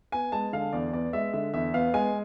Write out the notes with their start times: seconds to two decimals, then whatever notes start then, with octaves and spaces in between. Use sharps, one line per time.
0.12 B3 G#5
0.32 G#3 A5
0.53 D3 F5
0.73 E2 D5
0.93 B3 D5
1.13 G#3 E5
1.33 D3 E5
1.54 E2 E5
1.74 B3 F5
1.94 G#3 G#5